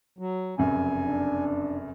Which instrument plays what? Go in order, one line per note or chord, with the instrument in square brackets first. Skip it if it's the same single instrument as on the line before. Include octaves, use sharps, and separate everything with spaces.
[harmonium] F#3
[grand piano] F1 F#2 C#3 [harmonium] G#5
[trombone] D4